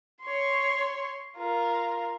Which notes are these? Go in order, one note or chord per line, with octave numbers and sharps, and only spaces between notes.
C#5 C6
F4 A#4